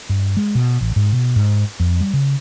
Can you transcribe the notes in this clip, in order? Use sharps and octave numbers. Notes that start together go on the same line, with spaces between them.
G2
G#3
B2
A1
G#2
B2
G#2
F2
G3
C#3